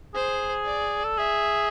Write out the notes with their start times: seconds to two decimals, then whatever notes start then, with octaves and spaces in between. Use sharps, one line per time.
0.15 G#4 C5
0.66 D5
1.04 A4
1.18 G#4 E5